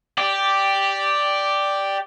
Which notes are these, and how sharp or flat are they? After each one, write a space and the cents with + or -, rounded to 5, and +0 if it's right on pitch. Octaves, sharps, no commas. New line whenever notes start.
G4 +0 D5 +0